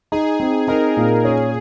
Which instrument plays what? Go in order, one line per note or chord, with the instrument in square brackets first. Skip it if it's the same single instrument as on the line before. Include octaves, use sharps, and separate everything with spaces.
[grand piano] D#4 [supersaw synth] G#4
[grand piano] C4
[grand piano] D#4 [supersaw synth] A#4
[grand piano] A#2
[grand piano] C#4 [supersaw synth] G#4